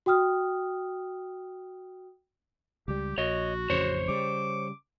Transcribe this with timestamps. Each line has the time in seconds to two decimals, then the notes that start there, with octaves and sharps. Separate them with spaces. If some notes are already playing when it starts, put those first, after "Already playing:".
0.06 F#4 G5 D#6 F6
2.88 C#2 G3 G4
3.18 A#1 F#4 C#5 D#5
3.70 A1 F2 C#3 C5 C#5
4.08 C#3 G3 D6